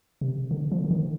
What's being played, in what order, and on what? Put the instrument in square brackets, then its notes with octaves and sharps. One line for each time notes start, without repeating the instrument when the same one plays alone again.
[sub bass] C3
D3
F3
D3
D#3